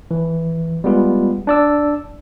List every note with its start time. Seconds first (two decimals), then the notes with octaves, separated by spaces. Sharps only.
0.11 E3
0.84 G3 G#3 B3 F4
1.47 D4 D5 E6